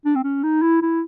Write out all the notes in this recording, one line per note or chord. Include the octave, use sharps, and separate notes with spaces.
D4
C4
C#4
D#4
E4
E4